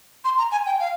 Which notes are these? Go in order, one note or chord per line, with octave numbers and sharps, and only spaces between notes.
C6
A#5
G#5
G5
F5